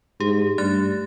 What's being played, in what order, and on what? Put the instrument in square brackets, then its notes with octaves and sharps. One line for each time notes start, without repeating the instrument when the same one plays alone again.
[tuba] G#2 [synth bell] G4
[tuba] G2 [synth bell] A3 F#6 A6